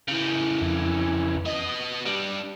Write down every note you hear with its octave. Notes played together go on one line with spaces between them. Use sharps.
C#3 E3 G6
F2 E4
B3 D#5 D#6
G3 D4